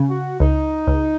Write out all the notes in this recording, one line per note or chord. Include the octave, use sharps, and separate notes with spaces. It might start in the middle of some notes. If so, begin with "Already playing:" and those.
Already playing: C#3
F#4
C#2 D#4
C#2